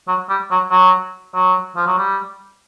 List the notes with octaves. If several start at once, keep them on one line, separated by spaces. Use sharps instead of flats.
F#3
G3
F#3
F#3
F#3
F3
F#3
G3